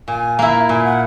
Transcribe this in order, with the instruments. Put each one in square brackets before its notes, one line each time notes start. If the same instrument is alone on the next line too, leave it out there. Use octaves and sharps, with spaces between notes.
[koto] A#2 [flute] G#5
[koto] A#3 E4 [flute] A#5
[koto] A#2 [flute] G#5
[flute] F#5